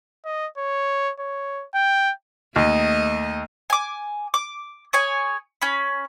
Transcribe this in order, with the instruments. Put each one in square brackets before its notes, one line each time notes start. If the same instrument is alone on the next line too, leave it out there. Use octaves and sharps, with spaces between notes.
[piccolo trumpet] D#5
C#5
C#5
G5
[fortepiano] D#2 [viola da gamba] A3 D#5
[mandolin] G#5 D6
D6
G#4 C#5 G#5
C#4 B5